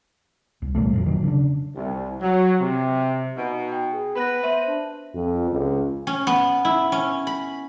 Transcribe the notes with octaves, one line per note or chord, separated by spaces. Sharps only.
C2
E1 A#2 G3 A3
D1 F2 F#3
D#3 F#3
C#3 D4
C2
F#3
C3
B2 D#4
G5
G#4
B3 B4 B5 F#6 A#6
C5 E5 D#7 F#7
D4
F2
C#2
C#4
B3
E4
C#4
B5